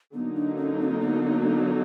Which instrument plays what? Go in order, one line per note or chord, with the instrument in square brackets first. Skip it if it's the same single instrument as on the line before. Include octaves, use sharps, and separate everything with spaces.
[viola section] D3 F#3 A#3 D#4 [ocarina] B3
[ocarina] D4
C#4
C4
B3